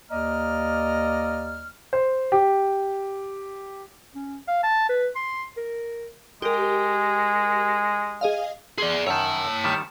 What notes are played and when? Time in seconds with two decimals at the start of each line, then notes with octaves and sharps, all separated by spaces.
0.11 D#2 A#3 D5 D#5 A#5 F6
1.93 C5
2.32 G4
4.15 C#4
4.48 F5
4.64 A5
4.89 B4
5.16 C6
5.57 A#4
6.42 G#3 G4 A#4
8.21 G#4 D#5 F5
8.78 G#4 D5 C6
9.07 F#2 D#3 C#5 A5 E6
9.64 D#3 G3 E7